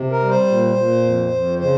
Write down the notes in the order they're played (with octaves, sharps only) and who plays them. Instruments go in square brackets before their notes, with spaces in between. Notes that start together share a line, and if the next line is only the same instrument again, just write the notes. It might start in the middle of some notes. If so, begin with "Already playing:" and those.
Already playing: [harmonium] C3
A#4
G3
C5
A#2
A#2
F2
F2
C#3 C5